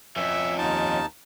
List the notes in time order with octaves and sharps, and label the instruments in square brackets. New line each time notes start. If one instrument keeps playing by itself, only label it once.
[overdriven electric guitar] F2 C#4 [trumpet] E5
[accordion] D#2 D#4 A5 [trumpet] F4